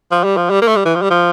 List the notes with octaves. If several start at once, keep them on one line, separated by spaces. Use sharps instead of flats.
F3
G3
F3
G3
A#3
A3
G3
E3
F3
G3
F3